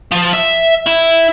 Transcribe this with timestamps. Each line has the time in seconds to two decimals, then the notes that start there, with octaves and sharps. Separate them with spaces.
0.12 F3
0.33 E5
0.86 E4